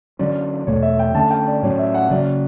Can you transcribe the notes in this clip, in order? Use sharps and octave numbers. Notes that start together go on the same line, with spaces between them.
D3 F#3 C#4 D5
E2 B2 A3 C#5
E5
G5
D3 A3 C#4 A5
G5
D5
A2 F#3 C#4 C#5
E5
F#5
C#3 F#3 C#4 D5